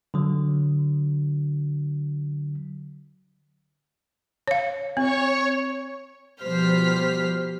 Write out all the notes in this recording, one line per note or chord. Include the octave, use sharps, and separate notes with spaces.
D3 F#3
C#5 F5
C4 C#5 C#6
B2 F3 G3 C5 F6 B6